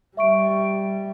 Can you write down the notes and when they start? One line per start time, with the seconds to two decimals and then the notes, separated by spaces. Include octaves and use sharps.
0.17 G3 E5 C#6 D7